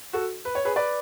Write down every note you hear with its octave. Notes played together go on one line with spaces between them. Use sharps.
F#4 A4
B4
C#5
G#4 B4
B4 D5